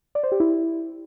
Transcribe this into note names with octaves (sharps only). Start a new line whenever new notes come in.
D5
C5
G4
E4